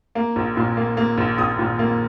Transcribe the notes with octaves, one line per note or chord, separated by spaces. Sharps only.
A#3
A#1
A#2
A#3
A#3
A#1
A#1 D#6
A#2
A#3